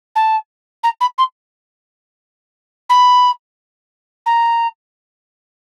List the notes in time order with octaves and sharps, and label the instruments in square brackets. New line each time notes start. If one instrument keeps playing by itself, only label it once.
[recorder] A5
A#5
B5
C6
B5
A#5